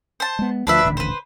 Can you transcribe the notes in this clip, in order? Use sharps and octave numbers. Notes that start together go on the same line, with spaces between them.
C5 A5
G#3 B3
D2 F3 D4 B4 E5
D#1 A1 D3
B4 C5